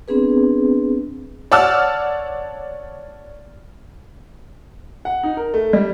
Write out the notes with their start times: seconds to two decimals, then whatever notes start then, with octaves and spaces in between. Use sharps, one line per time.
0.08 B3 C4 D4 G#4 B4
1.52 C#5 D5 F#5 A5 E6 F6
5.05 F#5
5.23 D#4
5.37 A#4
5.54 A3
5.73 G3